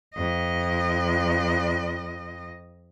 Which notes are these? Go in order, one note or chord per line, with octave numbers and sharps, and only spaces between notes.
F2 D#5